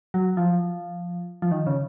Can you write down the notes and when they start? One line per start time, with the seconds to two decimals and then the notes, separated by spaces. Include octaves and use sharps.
0.14 F#3
0.37 F3
1.42 F3
1.51 D#3
1.67 C#3